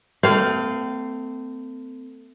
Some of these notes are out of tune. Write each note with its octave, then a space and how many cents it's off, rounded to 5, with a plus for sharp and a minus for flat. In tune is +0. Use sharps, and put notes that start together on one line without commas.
A3 +25 C4 -35 F5 +0